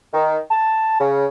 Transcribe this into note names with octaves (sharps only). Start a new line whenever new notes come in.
D#3
A5
C#3